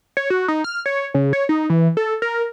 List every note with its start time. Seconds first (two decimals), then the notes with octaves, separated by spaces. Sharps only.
0.17 C#5
0.30 F#4
0.48 D#4
0.64 F6
0.86 C#5
1.14 C#3
1.33 C#5
1.49 D#4
1.70 E3
1.97 A4
2.22 A#4